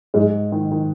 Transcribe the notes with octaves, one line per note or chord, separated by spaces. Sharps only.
G#2 G#3
D#3
D#3